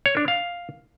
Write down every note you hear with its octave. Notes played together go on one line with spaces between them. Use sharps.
C#5
D4
F5